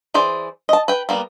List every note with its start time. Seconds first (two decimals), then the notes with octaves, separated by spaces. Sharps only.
0.14 E3 G#4 C5 D5
0.69 D#5 A5
0.88 B4 G5
1.09 G3 A#3 B3